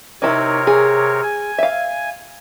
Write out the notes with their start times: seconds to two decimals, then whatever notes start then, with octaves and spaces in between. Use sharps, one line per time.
0.22 C3 D#4 E4 A#4 C#5
0.67 G#4
1.23 G#5
1.58 E5 F5